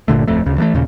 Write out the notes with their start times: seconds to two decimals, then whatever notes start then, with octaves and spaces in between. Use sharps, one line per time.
0.08 G1 A#2 D3 A3
0.28 D1 F2 A3
0.46 D2 C#3
0.58 E3 G3 A3
0.74 D#2 A#2 C#3